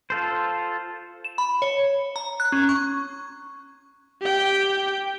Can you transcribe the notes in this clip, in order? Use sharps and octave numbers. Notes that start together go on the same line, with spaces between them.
F4 A4 C5
E7
B5
C#5
A#5
F#6
C#4
C#6
G4 G5